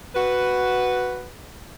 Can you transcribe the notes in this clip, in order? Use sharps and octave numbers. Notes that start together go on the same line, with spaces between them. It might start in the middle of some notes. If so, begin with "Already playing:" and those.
F#4 B4